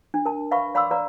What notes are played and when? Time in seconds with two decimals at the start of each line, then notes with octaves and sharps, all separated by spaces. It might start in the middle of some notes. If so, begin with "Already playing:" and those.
0.14 D4
0.25 A#4 A5
0.51 B4 E5 F5 B5 C#6
0.75 D5 F5 B5 C6 D6 E6
0.91 B4 D5 F5 A#5